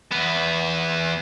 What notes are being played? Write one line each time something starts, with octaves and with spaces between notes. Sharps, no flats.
E2 B3